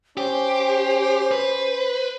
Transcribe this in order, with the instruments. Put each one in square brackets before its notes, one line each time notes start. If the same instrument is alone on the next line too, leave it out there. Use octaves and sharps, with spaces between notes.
[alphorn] C#4 [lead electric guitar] G4 [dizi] C5
[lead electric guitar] B4